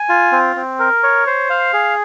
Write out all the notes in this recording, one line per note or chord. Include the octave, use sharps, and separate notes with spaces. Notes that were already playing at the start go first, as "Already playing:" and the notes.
Already playing: G#5
F4
C4
C4
A#4
C#5
C5
F5
G#4